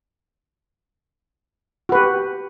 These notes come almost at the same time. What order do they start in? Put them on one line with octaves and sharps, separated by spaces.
F#4 B4 G4